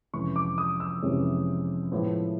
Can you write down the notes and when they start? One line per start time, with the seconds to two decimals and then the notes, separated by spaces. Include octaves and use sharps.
0.13 F2 C3 E3 G#3 C#4 C#6
0.36 D6
0.58 D#6
0.80 E6
1.03 F2 C3 E3 G#3 C#4
1.92 A2 F3 G#3 B3 E4